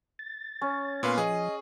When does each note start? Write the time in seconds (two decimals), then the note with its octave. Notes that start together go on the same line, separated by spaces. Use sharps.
0.19 A6
0.62 C#4
1.03 A#2 B3 B4 F5 C6
1.18 F3 G#4 D#5